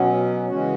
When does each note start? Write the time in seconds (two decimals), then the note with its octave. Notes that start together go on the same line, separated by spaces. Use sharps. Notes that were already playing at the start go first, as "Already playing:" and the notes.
Already playing: B2 F#3 C#4 F#5
0.49 C#3 E3 G#3 C#4 F#4